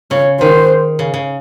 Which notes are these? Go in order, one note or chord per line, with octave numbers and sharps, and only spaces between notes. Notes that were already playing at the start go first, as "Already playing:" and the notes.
C#3 C#5
D#3 C5
C#3
C#3